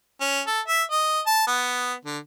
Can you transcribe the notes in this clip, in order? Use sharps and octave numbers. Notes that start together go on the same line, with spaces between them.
C#4
A4
E5
D#5
A5
B3
D3